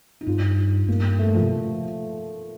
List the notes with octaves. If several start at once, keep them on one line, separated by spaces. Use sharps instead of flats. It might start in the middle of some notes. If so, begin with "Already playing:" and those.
D#4
G2 F4
G2 A#3
A3
F3
C3